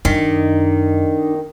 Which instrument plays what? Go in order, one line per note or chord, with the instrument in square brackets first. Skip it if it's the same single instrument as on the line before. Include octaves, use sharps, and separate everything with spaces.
[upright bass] F#2 [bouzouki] D#3 [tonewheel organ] D4 D#4